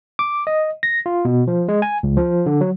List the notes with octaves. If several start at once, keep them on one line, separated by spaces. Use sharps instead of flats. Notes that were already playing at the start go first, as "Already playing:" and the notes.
D6
D#5
A#6
F4
B2
F3
G#3
G#5
C#2
F3
D3
F#3